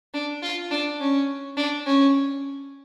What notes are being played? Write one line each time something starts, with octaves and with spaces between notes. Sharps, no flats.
D4
F4
D4
C#4
D4
C#4